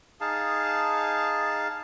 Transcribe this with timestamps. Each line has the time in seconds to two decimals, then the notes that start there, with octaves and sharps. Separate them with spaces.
0.21 D#4 G#4 F5 A5